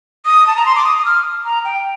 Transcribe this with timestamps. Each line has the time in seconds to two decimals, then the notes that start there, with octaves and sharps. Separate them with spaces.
0.25 D#6
0.47 A5
0.57 A#5
0.66 C6
0.76 D6
0.85 D#6
0.98 D#6
1.05 F6
1.45 A#5
1.65 G5